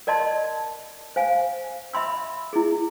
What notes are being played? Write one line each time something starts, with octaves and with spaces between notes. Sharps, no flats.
A#4 D5 D#5 A5 C6
C5 F5 G#5
E5 B5 C6 E6
E4 G#4